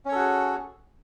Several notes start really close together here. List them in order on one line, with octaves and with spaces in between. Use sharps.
C#4 C#5 A4 F#4 G#4